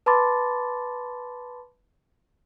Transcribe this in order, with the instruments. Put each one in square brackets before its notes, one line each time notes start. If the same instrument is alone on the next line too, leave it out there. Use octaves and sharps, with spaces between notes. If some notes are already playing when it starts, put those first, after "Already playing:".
[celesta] B4 A5 B5 C6 D6 A6